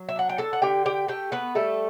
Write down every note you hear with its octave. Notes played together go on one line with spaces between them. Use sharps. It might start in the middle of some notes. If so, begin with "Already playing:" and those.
Already playing: F#3
E5
D4 F#5
G5
A4 A5
F#5
D3 G4 G5
G4 G5
A3 G4 G5
B3 B4
G3 A3 A4